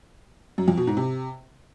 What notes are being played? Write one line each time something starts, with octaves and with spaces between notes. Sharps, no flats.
F#2
F2
B2
G#2
C3